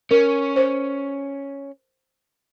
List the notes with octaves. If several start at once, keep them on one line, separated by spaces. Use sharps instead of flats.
C#4 A#4
C5